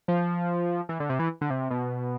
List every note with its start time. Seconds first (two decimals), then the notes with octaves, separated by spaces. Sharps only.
0.08 F3
0.89 E3
1.00 D3
1.09 C3
1.19 E3
1.41 D3
1.50 C3
1.70 B2